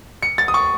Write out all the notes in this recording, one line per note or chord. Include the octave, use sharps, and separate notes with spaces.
C#7
A6
D#6
C#6